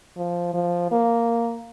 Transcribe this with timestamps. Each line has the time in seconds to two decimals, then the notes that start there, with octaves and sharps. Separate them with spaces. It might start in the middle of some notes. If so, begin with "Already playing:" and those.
0.17 F3
0.54 F3
0.91 A#3